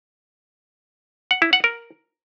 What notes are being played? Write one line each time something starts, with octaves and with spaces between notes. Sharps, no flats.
F#5
E4
F#5
A#4